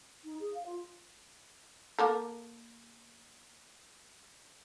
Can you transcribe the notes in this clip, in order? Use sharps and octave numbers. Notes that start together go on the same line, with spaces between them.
D#4
G#4
F5
F4
A#3 A4 A#4